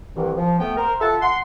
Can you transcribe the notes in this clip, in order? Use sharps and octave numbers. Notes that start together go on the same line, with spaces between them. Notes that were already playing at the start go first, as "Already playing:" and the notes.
C2 D#3 E3
F3
A3 B3 G5
A#4 C5
F4 A4 E5 F#5 A5
F#5 C6